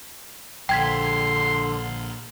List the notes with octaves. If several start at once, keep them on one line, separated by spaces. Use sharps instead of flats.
A#1 D3 G5 C6 G#6 B6